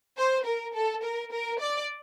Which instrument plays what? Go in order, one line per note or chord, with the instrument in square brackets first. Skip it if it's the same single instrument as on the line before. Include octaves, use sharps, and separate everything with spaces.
[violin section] C5
A#4
A4
A#4
A#4
D5